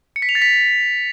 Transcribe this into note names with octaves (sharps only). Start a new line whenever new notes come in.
C#7
B6
F7
A6
B6